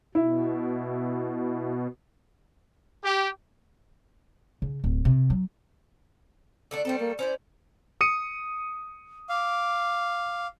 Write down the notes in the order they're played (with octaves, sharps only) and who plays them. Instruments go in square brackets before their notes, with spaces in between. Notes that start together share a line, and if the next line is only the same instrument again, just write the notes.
[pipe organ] B2 [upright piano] E4
[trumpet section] G4
[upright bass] C#3
D1
C3
F#3
[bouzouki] D3 A3 D4
[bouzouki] G3 A3 A4 [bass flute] C4
[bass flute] A#3
[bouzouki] C#4 E4 D5 [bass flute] C5
[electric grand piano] D#6 C#7 D#7
[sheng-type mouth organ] F5 [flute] D6